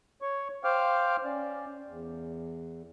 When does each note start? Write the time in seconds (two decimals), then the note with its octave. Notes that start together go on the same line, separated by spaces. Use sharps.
0.22 C#5 C#6
0.64 C5 F5 G5 D6 F6
1.25 C#4 D5
1.88 E2